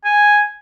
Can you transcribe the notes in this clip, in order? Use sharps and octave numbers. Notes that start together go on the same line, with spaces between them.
G#5